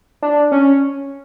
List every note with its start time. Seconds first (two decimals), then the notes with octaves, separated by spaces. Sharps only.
0.22 D4
0.52 C#4